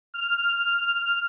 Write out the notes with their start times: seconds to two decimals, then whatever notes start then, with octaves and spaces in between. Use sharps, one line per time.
0.14 F6